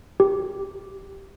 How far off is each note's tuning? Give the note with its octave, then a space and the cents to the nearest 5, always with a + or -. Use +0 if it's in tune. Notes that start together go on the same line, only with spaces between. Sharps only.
G4 -5